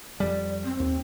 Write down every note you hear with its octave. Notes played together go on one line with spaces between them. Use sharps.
F2 G3 D5
C4
D#2